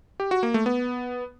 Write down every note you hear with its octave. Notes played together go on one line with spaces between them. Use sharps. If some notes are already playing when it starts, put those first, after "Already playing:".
G4
F#4
A#3
A3
B3